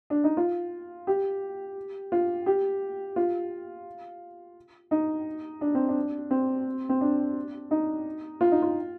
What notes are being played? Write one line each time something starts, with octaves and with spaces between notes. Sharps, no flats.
D4
D#4
F4
G4
F4
G4
F4
D#4
D4
C4
D4
C4
C4
D4
D#4
F4
D#4
F4